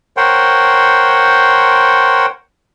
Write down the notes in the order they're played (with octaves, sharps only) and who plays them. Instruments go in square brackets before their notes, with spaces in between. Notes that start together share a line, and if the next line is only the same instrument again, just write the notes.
[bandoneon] A#4 C5 C#5 F#5 G5 C6